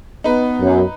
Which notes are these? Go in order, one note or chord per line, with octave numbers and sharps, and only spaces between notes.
B3 D#4 B4
F#2